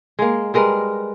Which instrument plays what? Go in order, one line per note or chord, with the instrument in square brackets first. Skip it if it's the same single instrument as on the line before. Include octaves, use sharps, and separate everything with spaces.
[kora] G#3 A#3
G3 G#3 A#4 B4